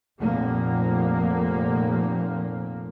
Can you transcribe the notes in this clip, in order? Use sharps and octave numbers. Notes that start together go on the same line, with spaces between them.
F1 A#2 F3 A#3